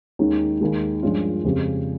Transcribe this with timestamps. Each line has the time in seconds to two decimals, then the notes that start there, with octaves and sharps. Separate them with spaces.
0.19 D#2 D#3 G#3 C#4
0.61 D#2 D#3 G#3
1.03 G2 F3 G#3 C#4 F4
1.44 F2 C#3 G#3 C4 G4